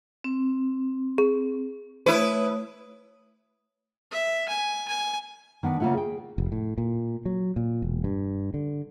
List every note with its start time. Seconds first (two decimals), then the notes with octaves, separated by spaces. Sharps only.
0.24 C4
1.18 G#4
2.06 A3 E4 B4 C#5 D#6
4.12 E5
4.48 G#5
4.88 G#5
5.63 D#3 B3 D4
5.80 C#3 A#3 B3 F4 E5 F#5
5.94 G#4 G5
6.38 F1
6.52 A2
6.78 A#2
7.25 F#3
7.56 A#2
7.82 E1
8.04 G2
8.54 D3